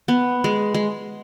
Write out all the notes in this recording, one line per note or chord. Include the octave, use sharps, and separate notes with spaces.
B3
G#3
G#3